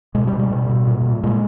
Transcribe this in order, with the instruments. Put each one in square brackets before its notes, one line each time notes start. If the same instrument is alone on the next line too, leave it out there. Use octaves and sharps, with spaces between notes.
[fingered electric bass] B2 G#3
G3
B2
G3
B2
B2
A#2
A#2
A#2 G#3